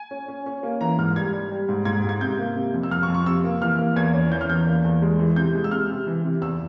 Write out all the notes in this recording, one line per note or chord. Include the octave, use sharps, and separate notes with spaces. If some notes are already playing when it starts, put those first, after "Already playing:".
Already playing: G#5
C#4
C#4
C#4
A#3
E3 A#5
G#2 F6
G3 G#6
G3
G3
G#2
G#2 G#6
G#2
G#6
C3 G6
A#3
C3
F2
E6
F2 F6
C#6
F2
C#6
C3 E6
A#3
E3 F6
A#3
E2 G#6
C#4
E3 G6
F6
E2 G6
A#3
E2
G#3
E3
C3 G6
G#3
E6
C3 F6
C3
E3
C3
E2 E6